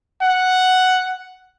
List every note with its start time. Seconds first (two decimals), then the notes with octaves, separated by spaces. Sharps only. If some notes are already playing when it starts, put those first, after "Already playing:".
0.22 F#5